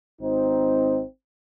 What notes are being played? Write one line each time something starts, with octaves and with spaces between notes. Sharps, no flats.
G#1 C4 D#4